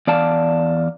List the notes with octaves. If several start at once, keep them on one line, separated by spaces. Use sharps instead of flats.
E2 D5 F5 A5